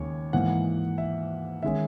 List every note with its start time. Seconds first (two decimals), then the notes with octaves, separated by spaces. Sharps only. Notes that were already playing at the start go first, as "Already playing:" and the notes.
Already playing: D#2 C#3 G#3 C#5
0.33 G#2 E3 A#3 F#5
0.98 E5
1.63 D#3 G#3 C#4 E5